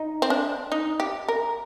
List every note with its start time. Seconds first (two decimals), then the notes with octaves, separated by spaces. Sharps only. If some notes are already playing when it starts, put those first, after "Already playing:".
Already playing: D#4
0.22 C4
0.30 D4
0.72 D#4
1.00 G4
1.28 A#4